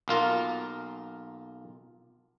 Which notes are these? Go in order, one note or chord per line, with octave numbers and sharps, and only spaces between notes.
B1 A#3 F4 A#4